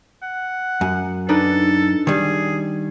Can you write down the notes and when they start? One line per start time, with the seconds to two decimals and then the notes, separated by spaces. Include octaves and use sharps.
0.23 F#5
0.81 F#2
1.29 D4 D#4 A4 B4
2.07 D#3 G3 G#4